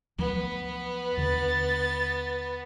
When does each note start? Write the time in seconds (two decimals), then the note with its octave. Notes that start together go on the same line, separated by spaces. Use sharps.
0.18 D2 F3 F#3 B3
1.17 D#2 D3 A6